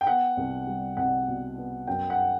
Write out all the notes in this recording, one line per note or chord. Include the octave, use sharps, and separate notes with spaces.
G5
B3 F#5
C2
G3
C2 F#5
B2
B3
F#2 G5
F#5